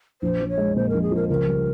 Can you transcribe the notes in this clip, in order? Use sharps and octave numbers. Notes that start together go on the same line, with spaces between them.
A#1 C5
F3
C#5
G#3
A#2 C5
A#1 A#4
G#4
F3 A#4
C#2 A#4
G3